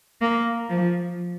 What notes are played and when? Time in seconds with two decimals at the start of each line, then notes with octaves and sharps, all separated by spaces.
0.21 A#3
0.69 F3